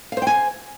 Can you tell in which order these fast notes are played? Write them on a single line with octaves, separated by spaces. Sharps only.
F5 C5 G5 G#5